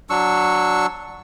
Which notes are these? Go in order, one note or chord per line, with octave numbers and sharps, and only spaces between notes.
F#3 D4 C#6 E6